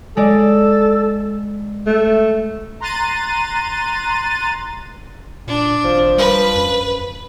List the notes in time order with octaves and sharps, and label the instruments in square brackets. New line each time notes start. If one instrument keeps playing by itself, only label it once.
[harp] G#3 D5 [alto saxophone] A4
[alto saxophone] A3
[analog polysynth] A#5 C6 F#6 A6 D#7
[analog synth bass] A#2 [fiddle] D4
[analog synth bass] G#1 [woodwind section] F3
[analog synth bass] G3 [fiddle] B4
[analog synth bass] F#2